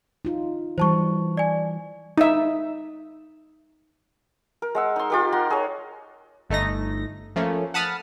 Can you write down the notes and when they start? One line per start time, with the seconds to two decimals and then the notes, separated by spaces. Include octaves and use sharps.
0.25 D#4 F4
0.78 E3 G3 C5 A5 C#6
1.37 D5 G#5
2.18 D#4 E5
4.62 A#4
4.75 G#3 F#5 E6
4.96 D#4 C6
5.10 F4 G4 A#4
5.32 F#5 A#5 C6
5.50 G#4 C#5
6.50 G1 A3 D#4 A#6
7.36 F3 A3 A#3 C#4
7.74 F#5 A5 B5 D#6 F6